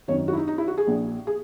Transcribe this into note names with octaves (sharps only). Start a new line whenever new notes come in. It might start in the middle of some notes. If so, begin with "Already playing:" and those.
G#1 F#2 D#3 C#5
F#4
E4
D#4
D#4
E4
F#4
G#4
A#1 A#2
G#4